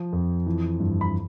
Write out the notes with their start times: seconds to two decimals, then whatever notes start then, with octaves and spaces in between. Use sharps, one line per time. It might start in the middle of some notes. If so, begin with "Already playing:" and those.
Already playing: F3
0.13 F2
0.46 E3
0.80 G2
1.01 B5